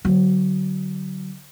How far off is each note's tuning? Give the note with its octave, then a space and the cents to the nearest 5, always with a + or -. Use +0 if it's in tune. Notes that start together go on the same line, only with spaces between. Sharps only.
D3 +0 F#3 +20